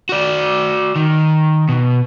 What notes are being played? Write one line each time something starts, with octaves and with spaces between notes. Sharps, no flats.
F#4 D5
D#3
B2